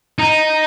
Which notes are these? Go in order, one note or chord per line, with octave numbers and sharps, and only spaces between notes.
D#4